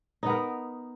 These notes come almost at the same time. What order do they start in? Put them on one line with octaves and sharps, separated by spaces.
D#4 B3 A#4